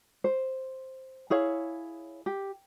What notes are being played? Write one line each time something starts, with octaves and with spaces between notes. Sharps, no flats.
C5
E4 G#4 C#5 F5
G4